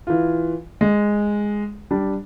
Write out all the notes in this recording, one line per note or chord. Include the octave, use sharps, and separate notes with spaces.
E3 F4
G#3
G3 D4